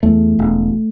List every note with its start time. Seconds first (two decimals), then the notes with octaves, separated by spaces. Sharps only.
0.03 E2 A3
0.39 E1